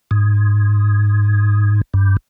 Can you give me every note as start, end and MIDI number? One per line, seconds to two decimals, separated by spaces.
0.11 1.81 44
1.94 2.17 43